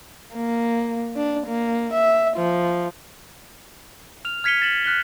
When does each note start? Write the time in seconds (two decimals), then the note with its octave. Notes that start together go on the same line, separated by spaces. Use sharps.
0.33 A#3
1.17 D4
1.46 A#3
1.93 E5
2.37 F3
4.25 F6 F7
4.44 F6 G#6 B6 C#7 D#7 G7
4.62 A6 E7 F#7
4.84 F6 F#6 B6 G7